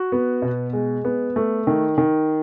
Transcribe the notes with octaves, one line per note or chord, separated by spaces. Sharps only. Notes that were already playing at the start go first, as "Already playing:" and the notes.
Already playing: F#4
B3
B2
G#3
B3
A3
D#3
D#3